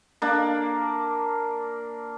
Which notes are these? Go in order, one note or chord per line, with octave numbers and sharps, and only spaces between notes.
A#3 D4